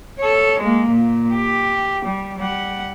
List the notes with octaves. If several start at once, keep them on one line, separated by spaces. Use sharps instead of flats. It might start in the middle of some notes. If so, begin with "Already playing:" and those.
A4 C#5
G#3 A#3
A#2
G4
G3
G3 F#5